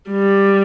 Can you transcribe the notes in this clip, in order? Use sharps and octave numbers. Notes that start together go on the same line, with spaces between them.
G3